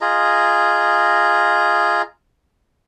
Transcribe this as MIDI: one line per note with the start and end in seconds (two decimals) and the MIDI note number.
0.01 2.02 65
0.01 2.02 68
0.01 2.02 75
0.01 2.02 82